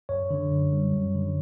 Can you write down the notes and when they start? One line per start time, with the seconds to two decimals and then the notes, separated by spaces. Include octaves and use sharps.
0.09 F#2 C#5
0.31 D3
0.51 F#2
0.73 G3
0.93 F#2
1.15 D3